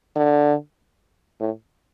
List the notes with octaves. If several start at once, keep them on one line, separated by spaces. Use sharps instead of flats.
D3
A2